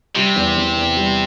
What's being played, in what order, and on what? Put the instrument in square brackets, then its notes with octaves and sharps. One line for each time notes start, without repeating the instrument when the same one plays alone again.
[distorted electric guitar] C3 [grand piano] G3
[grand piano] E2
E2
E2
G3